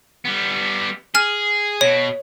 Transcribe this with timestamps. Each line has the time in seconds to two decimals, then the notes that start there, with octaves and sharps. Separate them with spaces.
0.25 G3 B3
1.15 G#4 G#5 F6
1.81 B2 C#5